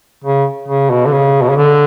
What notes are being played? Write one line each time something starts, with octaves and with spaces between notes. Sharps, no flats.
C#3
C#3
B2
D3
C#3
B2
C#3
D3